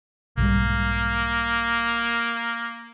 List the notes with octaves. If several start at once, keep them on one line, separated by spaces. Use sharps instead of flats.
B1 G#2 G3 A#3